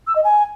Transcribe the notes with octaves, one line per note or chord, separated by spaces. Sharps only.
E6
D#5
G#5